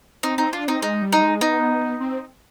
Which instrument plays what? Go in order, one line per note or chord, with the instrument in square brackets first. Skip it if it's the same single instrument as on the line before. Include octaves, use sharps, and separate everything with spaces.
[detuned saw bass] C4 [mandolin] D#4
[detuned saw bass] C4 [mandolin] D#4
[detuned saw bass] D4 [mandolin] F4
[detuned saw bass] C4 [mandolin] D#4
[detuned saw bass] G#3 [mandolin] D#4
[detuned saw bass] G3
[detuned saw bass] G3 [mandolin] D#4
[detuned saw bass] G#3
[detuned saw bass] B3 [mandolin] D#4
[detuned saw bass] C4